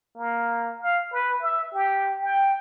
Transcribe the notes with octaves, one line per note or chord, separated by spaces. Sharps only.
A#3
F5
B4
E5
G4
G5